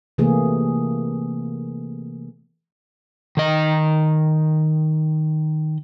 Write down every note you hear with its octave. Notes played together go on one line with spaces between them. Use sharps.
C3 E3 A3 A#3 G#4
D#3 D#5